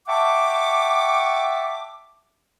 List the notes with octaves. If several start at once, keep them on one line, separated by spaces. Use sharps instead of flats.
E5 F#5 G5 A5 C#6 D6